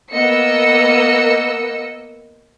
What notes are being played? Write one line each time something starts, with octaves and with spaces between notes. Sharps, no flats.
A#3 B3 D#5 E6 C#7